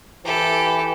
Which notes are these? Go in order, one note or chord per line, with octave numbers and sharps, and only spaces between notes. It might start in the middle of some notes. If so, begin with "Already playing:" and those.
E3 G4 A4